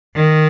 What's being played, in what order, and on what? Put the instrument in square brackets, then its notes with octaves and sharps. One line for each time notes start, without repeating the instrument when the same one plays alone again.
[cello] D#3